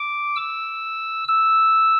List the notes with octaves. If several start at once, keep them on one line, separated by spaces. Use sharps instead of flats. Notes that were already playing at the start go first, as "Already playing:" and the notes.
Already playing: D6
E6
E6